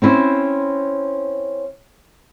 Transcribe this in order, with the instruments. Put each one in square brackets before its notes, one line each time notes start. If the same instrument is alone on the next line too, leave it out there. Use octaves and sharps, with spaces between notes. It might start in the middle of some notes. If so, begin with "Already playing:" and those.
[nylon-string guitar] C4 C#4 E4 C5